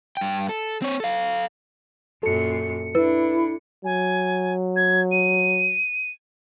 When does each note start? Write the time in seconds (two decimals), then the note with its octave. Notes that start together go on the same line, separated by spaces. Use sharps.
0.17 G2 G5
0.49 A4
0.82 C4 C#5
1.00 A4 F5
2.23 F#2 A#2 A4 C#7
2.95 D4 E4 B4
3.85 F#3 G#5
4.76 G#6
5.12 D#7